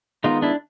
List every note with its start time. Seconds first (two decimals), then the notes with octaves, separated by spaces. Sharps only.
0.24 D#3 G#3 B3 D#4 F4
0.42 D4 E4